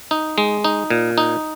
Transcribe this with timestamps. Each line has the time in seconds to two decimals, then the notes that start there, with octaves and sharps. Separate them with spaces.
0.11 D#4
0.38 G#3
0.64 D#4
0.90 A#2
1.18 D#4